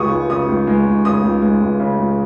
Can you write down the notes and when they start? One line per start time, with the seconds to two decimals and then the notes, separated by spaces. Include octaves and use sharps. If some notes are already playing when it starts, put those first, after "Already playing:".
Already playing: C#2 C#3 G#3 C#6 D#6
0.11 C#2
0.30 C#3 D#6
0.49 C#2
0.67 G#3
0.86 C#2
1.04 C#3 D#6
1.24 C#2
1.42 G#3
1.61 C#2
1.80 C#3
1.99 C#2